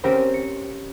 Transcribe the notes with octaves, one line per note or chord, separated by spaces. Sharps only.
C4 C#4 G4 A#4 C5
C#7